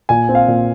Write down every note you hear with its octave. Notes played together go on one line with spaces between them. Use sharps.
A#2 G#5
C4
F5
A#2